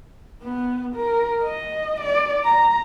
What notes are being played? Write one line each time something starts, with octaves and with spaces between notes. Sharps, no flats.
B3
A#4
D#5
D5
A#5